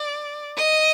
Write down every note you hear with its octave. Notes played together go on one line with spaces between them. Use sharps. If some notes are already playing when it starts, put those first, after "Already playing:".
Already playing: D5
D#5